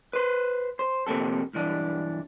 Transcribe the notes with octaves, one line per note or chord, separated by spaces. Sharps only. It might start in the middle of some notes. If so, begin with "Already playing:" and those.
B4 C5
C5
F2 C3 A#3 C4 A4
B1 G2 E3 D4